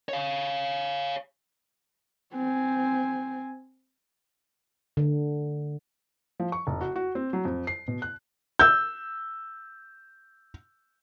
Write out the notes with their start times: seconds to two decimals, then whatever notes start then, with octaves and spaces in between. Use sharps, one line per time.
0.09 C#5 F5
2.35 C4 G#5
4.97 D3
6.40 F3
6.52 C#6
6.67 F1
6.81 F#4
6.96 F#4
7.15 C4
7.33 F#3
7.45 F2
7.67 C7
7.88 B2
8.02 F#6
8.59 E6 G6